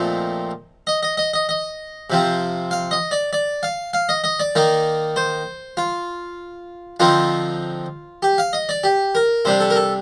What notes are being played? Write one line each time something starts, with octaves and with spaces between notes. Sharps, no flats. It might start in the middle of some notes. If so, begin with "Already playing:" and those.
Already playing: A#2 F3 A3 C4 D#4
D#5
D#5
D#5
D#5
D#5
C3 F3 C4
F5
D#5
D5
D5
F5
F5
D#5
D#5
D5
D#3 A#3 D#4
C5
F4
D3 F3 C4 D#4 F4
G4
F5
D#5
D5
G4
A#4
C3 G3 D4 C5
A4
A#4
A4